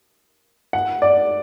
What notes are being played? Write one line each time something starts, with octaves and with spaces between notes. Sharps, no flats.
F#5
D5